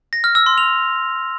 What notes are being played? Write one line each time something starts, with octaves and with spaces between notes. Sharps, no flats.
A#6
F6
E6
C6
F7